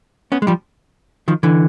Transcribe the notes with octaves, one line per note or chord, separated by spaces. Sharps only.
B3 C#4
G#3
F3 G3
D#3 F3
D3 E3